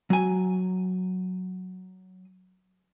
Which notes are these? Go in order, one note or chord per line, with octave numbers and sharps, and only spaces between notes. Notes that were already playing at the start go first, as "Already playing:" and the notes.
F#3 G#5